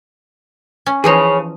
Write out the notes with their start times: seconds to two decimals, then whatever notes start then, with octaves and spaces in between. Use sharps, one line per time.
0.86 C#4
1.04 E3 F3 D#4 G#4 C#5